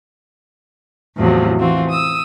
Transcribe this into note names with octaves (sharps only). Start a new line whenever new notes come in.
E2 A2 C3 F3 F#3
E3 C4 F4 F#4
D#6 E6